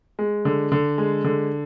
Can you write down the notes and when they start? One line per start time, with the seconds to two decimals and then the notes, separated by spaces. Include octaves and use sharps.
0.19 G#3
0.45 D3
0.72 D3
0.98 G#3
1.24 D3